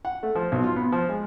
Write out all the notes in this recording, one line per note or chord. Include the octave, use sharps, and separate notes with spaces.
F#5
A3
F3
B1
F4
B3
F3
G#3